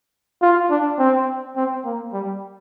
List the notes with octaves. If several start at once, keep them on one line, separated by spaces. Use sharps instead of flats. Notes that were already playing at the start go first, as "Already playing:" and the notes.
F4
D4
C4
C4
A#3
G3